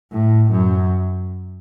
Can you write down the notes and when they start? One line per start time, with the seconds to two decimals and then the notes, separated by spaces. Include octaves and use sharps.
0.12 A2
0.51 F#2